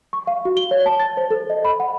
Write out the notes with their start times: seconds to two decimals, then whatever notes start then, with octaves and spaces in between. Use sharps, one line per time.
0.13 C#6
0.27 F5
0.45 F#4
0.57 G7
0.71 C#5
0.86 A5
1.00 A6
1.17 C5
1.30 A4
1.50 D#5
1.65 B5
1.80 F#5